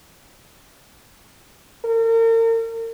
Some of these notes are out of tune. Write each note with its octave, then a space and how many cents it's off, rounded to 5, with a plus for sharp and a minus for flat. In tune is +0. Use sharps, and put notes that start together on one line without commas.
A#4 -40